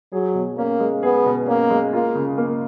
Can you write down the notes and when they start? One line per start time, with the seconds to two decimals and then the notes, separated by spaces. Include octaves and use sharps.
0.12 F#3 G#4
0.35 B2
0.57 A#3 C#4
0.80 G#3
1.03 B3 G#4
1.26 B2
1.47 A#3 C#4
1.70 G#3
1.93 A#3 F4
2.15 C#3
2.38 A#3